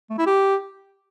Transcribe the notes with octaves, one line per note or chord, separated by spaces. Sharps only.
A3
E4
G4